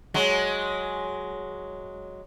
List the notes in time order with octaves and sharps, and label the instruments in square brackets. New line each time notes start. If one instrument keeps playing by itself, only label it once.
[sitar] F#3 G#3